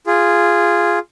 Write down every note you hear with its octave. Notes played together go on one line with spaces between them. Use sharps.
F4 G#4